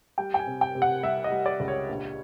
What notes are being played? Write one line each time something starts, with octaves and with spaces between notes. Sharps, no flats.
G3 G5
G5
G#5
C3
G5
C3
F#5
G3 E5
D#5
G3
D5
C#2
C#5
A#1